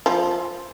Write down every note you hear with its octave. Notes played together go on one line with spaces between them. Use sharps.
F3